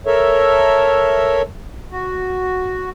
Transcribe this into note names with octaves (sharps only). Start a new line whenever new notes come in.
A4 A#4 C#5 E5
F#4